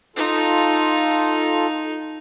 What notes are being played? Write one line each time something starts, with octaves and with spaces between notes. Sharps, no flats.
D#4 F4 A4